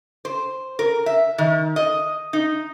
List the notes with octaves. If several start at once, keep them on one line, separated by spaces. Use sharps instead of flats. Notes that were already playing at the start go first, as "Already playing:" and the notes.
C5
A#4
E5
D#3
D#5
D#4